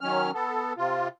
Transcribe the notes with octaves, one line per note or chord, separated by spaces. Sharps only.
D#3 F#3 C#4 F6
B3 A4
C3 F4